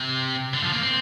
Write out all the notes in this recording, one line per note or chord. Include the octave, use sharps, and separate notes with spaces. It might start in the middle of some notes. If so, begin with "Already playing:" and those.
Already playing: C3
D3
F3
A#3
C4